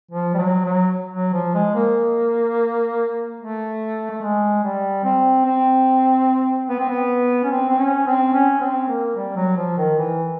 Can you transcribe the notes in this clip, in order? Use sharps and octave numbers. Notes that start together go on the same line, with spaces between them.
F3
G3
F#3
F#3
F#3
F3
G#3
A#3
A3
A3
G#3
G3
C4
C4
B3
C4
B3
C#4
C4
C4
C#4
C4
C#4
C4
A#3
G3
F#3
F3
D#3
E3